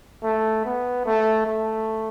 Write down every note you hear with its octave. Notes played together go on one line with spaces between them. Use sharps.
A3
B3
A3
A3